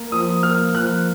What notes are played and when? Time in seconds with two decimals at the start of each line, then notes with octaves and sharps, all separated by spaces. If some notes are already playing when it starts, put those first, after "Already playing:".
Already playing: A#3
0.12 F3 D#6
0.43 A#3 F6
0.75 F3 F#6